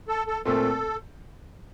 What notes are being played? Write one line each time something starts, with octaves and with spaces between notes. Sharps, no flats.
A4
A4
A#2 A3 C4 A4